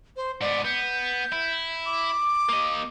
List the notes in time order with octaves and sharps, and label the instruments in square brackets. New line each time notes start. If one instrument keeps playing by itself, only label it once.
[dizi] C5
[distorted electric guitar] G#2 B3 [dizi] D5
[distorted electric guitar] B3 [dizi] G6
[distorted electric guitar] E4
[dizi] D6
[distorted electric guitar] A#3 D#5